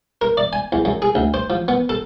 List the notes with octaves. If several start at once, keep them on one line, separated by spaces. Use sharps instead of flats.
A#4
D5
G#5
E2
F#2
G#4
D2
C5
F3
B3
A4